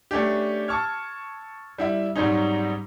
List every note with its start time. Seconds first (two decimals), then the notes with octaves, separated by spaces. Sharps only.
0.11 A3 C#4 D4 G4
0.68 A5 C#6 E6 F6 G#6
1.78 G3 E4 E5
2.16 G#2 F#3 G3 C4 C#4 D#4